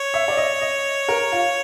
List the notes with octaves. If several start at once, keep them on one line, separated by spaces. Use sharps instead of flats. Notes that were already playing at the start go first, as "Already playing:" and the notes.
Already playing: C#5
E5
D5
D#5
D#5
A#4
F4